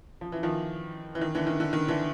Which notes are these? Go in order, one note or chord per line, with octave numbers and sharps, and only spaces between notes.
F3
E3
D#3 F3
E3
D#3
D3 E3
D#3
D3
D#3
D3 E3